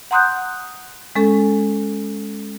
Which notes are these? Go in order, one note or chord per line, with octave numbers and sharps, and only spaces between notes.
F#5 A#5 C6 D#6 F#6 G6
G#3 C#4 A4